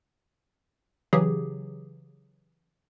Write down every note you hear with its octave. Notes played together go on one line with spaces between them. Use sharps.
C#3 E3 F#3 G4 G#4